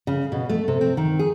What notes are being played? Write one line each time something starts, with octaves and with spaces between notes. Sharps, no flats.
C#3
B2
A3
C3
C4
D#3
G#4